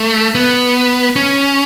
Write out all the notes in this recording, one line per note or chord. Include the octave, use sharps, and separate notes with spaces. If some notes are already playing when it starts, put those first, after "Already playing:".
Already playing: A3
B3
C#4